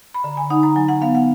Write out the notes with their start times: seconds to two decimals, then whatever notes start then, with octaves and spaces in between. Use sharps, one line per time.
0.14 B5
0.24 D3 A#5
0.37 G#5
0.50 D#4 F#5
0.63 A#5
0.76 F#3 G#5
0.89 F#5
1.01 B3 F5
1.15 F#5